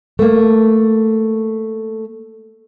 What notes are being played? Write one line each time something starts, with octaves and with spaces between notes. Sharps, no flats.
A3 A#3